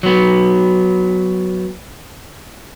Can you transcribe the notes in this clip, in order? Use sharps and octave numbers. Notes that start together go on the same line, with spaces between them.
F#3 B3